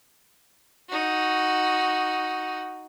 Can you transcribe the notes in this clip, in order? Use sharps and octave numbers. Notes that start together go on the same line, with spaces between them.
D#4 F#4